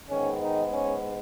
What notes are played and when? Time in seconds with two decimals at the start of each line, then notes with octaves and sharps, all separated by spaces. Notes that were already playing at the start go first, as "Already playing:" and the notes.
0.09 G#2 D#3 G#3 B3 C#4
0.40 D#3 D#4
0.71 C#4